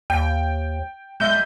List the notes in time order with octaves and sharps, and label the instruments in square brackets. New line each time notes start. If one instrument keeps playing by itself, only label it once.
[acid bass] D#2 [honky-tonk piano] G5
[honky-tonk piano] B1 E5 [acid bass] G#3 [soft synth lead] G6